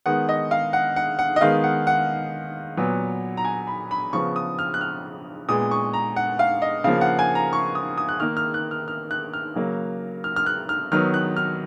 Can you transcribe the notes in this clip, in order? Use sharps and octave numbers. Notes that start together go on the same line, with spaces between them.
D#3 G#3 B3 F#5
D#5
F5
F#5
F#5
F#5
D#5
D#3 G#3 B3 F5
F#5
F#5
A#2 F#3 B3
A#5
G#5
B5
B5
C#3 F3 B3 C#6
D#6
F6
F#6
F6
A#2 G#3 B3 D#6
C#6
A#5
F#5
F5
D#5
C#3 F3 A#3 F5
F#5
G#5
A#5
C#6
D#6
D#6
F#6
D#3 A#3 F6
F6
F#6
F6
F6
F#6
F6
C#3 F#3 A#3
F6
F6
F#6
F6
D#3 F#3 B3 F6
F#6
F6